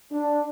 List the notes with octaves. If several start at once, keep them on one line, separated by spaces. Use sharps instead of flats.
D4